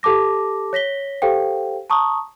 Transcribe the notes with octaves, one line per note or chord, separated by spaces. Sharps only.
G4 A4 A5 D6 A#6
C#5 A#6 B6 G7
G4 A4 C5 F5 G5
A5 A#5 C#6 D#6